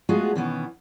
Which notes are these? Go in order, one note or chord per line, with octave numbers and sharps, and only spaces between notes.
G#3 A3 B3 F4 F#4 G#4
B2 D#3 E3 B3 C#4